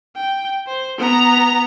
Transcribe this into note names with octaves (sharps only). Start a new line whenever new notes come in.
G5
C5
B3 A#5